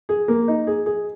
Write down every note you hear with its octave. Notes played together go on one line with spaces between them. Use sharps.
G#4
A#3
D#4
G#4
G#4